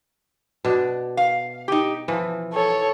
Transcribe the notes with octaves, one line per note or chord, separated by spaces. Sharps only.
B2 D4
F5
D#4 G4
E3 F3
A4 C#5